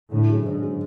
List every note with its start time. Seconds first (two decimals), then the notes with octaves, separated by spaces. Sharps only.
0.11 A2 D3
0.28 F#3 C#4 G#4
0.45 G#2 D3
0.62 F#3 C#4 G#4